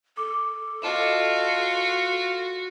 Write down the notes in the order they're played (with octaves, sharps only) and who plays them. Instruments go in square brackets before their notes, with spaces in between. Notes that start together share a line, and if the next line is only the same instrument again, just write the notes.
[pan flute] A4 [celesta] D6
[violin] F4 [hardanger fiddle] F#4 [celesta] D#5 A5 E7
[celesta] C7